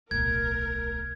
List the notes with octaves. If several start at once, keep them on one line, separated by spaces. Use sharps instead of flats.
D1 B1 A#4 G#6